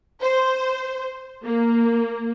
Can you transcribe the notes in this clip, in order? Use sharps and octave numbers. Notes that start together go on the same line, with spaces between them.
C5
A#3